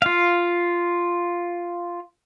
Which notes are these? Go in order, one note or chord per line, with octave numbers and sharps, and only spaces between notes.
F4 F5